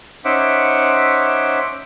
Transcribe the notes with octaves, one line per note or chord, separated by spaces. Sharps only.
C#4 D#4 C5 E5 F#5 D6